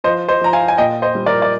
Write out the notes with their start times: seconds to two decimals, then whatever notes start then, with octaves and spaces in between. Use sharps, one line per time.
0.04 F3 C5 D#5
0.28 C5 D#5
0.41 F3 A#5
0.53 F5 G#5
0.68 G#5
0.78 A#2 D#5 G5
1.02 C5 D#5
1.15 G3
1.26 A#4 D5
1.42 D5